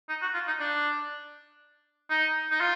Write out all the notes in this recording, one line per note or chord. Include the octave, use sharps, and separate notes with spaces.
D#4
F#4
F4
D#4
D4
D#4
D#4
F4